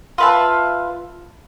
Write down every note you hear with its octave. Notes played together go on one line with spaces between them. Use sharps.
F4 B4 E5 A5